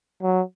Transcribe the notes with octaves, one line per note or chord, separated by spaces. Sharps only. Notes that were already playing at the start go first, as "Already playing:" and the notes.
F#3